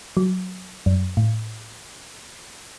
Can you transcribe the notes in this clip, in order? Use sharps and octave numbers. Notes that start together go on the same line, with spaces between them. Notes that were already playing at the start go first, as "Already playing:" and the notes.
F#3
F#2
A2